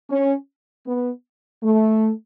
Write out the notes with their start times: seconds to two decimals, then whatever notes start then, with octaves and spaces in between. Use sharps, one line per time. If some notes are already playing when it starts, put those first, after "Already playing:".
0.10 C#4
0.86 B3
1.64 A3